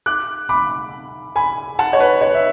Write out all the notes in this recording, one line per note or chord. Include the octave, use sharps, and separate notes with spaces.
D6 F#6
B5 D6
G#5 B5
F#5 A5
C#5
B4
C#5
E5